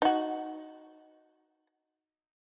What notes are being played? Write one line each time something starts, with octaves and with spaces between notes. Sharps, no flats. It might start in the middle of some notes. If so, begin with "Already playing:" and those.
D#4 F#4